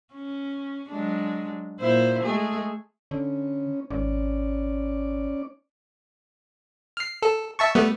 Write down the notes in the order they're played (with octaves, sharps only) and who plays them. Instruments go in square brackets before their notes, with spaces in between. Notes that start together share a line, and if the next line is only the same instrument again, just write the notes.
[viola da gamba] C#4
F#3 G#3 D4
A#2 E4 C5
G#3 A3 G#4
[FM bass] D3 [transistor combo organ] C#4
[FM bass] G#1 [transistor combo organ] C#4 D5
[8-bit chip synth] F6 C7
A4
E5 A5 C#6
G3 A3 B3